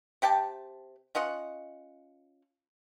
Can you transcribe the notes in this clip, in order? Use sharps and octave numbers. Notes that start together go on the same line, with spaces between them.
C3 G4 G5 A5
C#4 F4 D#5 F#5